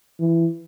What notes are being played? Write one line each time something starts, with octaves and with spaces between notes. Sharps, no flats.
E3